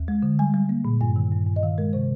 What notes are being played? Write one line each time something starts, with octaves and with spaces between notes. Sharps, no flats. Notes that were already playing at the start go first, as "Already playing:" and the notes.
Already playing: D#2
G#3
D3
G3 G#5
G3
A#3
A#2
G2 G#5
D#3
G2
G2
D#5
D#3 F5
G#3 A#4
C3 C5